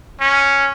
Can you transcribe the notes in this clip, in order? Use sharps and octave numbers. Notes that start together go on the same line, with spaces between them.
C#4